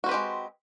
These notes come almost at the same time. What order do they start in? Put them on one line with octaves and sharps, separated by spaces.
F#4 C4 B4 G4 G#3